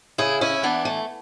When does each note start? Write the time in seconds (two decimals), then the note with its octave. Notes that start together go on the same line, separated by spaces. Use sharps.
0.18 C#3 E4 G#4
0.41 C#4 E4
0.63 E3 B3 D4
0.85 A3